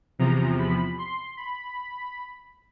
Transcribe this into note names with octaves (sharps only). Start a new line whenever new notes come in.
E2 C3 F3 A#5
B5
C6
B5